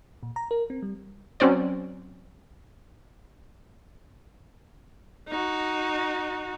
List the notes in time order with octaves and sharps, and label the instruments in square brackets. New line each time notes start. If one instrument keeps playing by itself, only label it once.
[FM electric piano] A#2
A#5
A#4
C4
G3
[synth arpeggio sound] F#3 C4 C#4 C5 D5
[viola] D#4 F#4